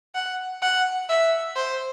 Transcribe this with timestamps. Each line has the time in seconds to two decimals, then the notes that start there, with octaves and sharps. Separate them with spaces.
0.15 F#5
0.62 F#5
1.09 E5
1.56 C5